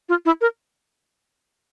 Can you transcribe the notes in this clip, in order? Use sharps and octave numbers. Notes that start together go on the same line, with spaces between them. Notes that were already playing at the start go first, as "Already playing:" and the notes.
F4
E4
A#4